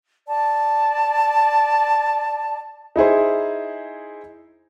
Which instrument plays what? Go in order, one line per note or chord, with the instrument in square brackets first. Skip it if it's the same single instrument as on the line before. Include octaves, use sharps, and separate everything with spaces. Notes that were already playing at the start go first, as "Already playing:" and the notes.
[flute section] D5 A5
[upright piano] D#4 E4 G#4 C5